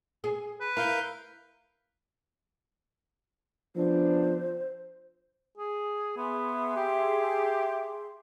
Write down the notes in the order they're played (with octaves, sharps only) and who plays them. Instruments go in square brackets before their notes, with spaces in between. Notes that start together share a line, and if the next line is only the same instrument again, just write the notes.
[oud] G#4
[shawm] B4
[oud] E4 [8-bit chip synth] A#4 F5 G6
[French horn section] C#3 B3 D4 [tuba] F3 [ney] C5
[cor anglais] G#4
[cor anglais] B3 [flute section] G#4 E5 C6
[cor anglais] G4